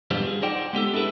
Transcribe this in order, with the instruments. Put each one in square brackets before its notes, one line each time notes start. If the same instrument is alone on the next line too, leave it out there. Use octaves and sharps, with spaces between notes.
[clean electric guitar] G3 B3 D4 F4 G4 C5
G#4
D#4 F4 C5 D5 F#5 G5
G#3 B3 G4 A4
D4 E4 G#4 A4 B4